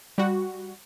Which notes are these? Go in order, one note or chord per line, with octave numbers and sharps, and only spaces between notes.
G3 F#4